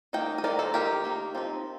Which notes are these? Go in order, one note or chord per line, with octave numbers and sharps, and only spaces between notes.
D#3 A#3 D#4 D#5 G5
D#5
D#3 A#3 D#4 A#4 D5
A4 C5
D#3 A#3 D#4 G4 A#4
D#3 A#3 D#4
F3 C4 D#4